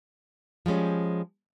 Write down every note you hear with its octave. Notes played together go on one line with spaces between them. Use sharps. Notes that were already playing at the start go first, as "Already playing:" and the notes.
F3 G3 G#3 C#4